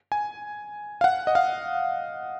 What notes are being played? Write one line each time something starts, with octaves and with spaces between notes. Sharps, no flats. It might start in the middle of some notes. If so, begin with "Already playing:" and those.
G#5
F5
F#5
D#5
F5